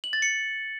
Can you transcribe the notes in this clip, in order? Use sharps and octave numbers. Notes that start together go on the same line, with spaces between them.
F#7
A6
C#7